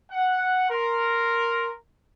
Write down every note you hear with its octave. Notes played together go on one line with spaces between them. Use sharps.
F#5
A#4 C6